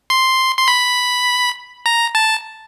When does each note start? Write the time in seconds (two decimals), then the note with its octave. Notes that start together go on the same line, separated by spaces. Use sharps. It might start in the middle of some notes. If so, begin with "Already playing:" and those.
0.10 C6
0.59 C6
0.68 B5
1.86 A#5
2.15 A5